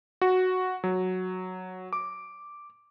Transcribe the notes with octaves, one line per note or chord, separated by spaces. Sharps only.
F#4
F#3
D6